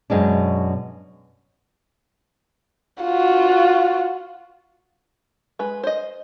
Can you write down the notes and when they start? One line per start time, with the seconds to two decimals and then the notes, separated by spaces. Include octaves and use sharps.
0.10 F#2 B2 G#3 D4
3.03 F4 F#4
5.59 G#3 B4
5.83 C5 D#5